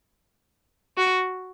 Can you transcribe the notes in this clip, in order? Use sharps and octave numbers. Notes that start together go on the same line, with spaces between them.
F#4